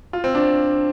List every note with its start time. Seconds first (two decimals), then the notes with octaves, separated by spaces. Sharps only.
0.13 F4
0.24 C4
0.35 D4